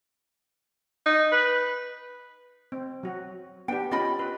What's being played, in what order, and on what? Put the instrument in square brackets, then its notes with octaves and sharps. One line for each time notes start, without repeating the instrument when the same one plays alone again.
[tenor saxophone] D#4
B4
[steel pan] C4
F#3 F#4
[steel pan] B3 D4 G4 [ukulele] G5
[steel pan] C#4 G4 [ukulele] F4 D#5 B5
[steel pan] B4